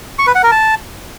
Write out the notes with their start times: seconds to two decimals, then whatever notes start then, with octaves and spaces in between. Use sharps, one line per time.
0.19 C#6
0.27 B4
0.35 F#5
0.43 A#4
0.51 A5